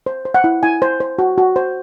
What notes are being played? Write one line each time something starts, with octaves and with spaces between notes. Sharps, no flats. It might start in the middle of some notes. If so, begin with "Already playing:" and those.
C5
C5
F#5
E4
E4 G#5
C5
C5
F#4
F#4
C5